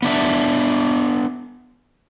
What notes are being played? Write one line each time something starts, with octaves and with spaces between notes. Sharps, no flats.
B3 D4 E5